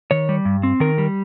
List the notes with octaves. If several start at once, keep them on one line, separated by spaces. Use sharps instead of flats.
D#3 C#5
G3
G2
C4
D#3 A#4
G3